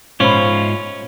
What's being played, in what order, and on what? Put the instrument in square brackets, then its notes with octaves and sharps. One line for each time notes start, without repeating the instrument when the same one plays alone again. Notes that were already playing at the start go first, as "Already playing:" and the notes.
[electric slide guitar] G#2 F4 [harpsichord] C#4 [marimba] C5 B5